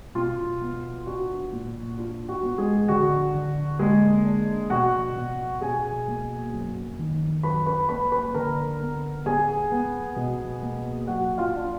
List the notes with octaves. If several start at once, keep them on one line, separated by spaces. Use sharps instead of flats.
B2 F4
B3
D4 F#4
A#2
D4 F4
F#4
B3
G#3 G#4
D3 F#4
D3
G#3 A#3 G#4
D4
B2 F#4 F#5
B2
B2 G#4 G#5
A#3
F#2
D#3
F#2 B4 B5
B4 B5
A#3 B4 B5
B4 B5
D3 A#4 A#5
B3
B3 G#4 G#5
B3
B2
A#3
F#3 F#4 F#5
F4 F5
D4